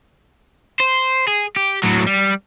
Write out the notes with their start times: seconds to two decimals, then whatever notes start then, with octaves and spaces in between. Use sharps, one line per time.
0.80 C5
1.27 G#4
1.56 G4
1.83 A2 F#3
2.07 G3